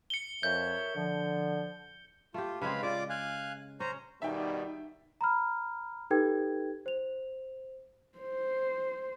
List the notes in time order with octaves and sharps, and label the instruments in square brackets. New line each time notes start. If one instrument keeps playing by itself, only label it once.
[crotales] C#7 G7
[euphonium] F2 [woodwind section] A#4 C#5 E5 [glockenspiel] G6
[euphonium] D3 [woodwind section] F3
[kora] A3 G4 [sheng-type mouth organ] F4
[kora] C#3 G#3 C4 [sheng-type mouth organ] B4 F5 B5
[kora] C#3 [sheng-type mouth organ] F4 D5 D6
[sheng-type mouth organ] F5 G#5 F#6
[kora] C#4 [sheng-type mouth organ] C5 A#5
[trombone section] B2 D#3 G3 [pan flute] D#4 [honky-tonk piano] E5 G5
[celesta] A#5 B5 F6
D#4 G4 A4 B4 G5 G#6
C5 F7
[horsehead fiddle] C5